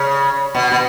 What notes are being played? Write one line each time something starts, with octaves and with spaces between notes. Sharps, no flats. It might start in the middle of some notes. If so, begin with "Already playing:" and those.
Already playing: C#3
B2
B2